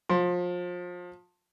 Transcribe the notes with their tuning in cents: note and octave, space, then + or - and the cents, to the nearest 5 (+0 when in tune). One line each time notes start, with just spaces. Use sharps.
F3 +25 C6 +20